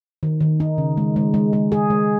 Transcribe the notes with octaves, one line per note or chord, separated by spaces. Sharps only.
D#3
D#3
D#4
C#3
G#3
G#3
G#3
G#3
G#4
G#3